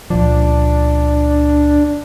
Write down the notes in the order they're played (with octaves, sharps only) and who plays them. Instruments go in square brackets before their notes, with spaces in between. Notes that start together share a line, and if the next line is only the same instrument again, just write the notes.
[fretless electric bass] C#2 A#2 F3 [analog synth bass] D4